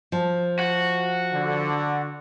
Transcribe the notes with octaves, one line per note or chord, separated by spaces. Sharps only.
F3
F#4
D3